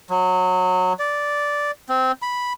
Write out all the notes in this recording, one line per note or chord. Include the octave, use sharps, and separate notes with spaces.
F#3
D5
C4
B5